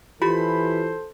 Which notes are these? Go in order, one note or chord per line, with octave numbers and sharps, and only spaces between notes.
E3 F4 G4 A4 C5 B5